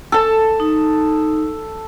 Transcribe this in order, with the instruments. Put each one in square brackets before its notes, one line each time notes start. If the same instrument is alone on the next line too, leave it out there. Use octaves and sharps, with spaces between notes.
[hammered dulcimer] A4 A5
[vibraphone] D#4